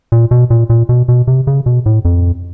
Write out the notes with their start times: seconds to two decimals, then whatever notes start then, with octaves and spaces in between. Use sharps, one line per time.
0.12 A#2
0.31 B2
0.50 A#2
0.70 A#2
0.89 B2
1.08 B2
1.27 C3
1.47 C#3
1.66 B2
1.86 A2
2.05 F2